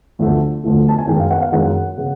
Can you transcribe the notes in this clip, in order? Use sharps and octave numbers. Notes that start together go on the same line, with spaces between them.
D2 D3 F3 A3
D2 D3 F3 A3
A5
G#5
F#2 D#3 G#3 G5
F5
F#5
F5
F#2 D#3 G#3 F#5
C#3